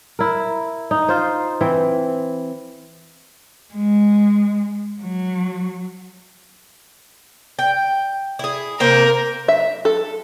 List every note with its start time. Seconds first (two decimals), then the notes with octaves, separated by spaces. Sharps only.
0.19 E4 A#4
0.91 D#4
1.08 F4 C5
1.61 E3 C4
3.73 G#3
5.01 F#3
7.59 G5
8.39 E4 G#4
8.80 C3 A#3 A#4 C5
9.48 E5
9.85 A4